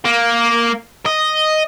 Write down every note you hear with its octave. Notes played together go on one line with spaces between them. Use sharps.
A#3
D#5